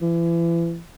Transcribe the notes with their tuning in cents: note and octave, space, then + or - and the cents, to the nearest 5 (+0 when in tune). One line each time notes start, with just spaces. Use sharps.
E3 +35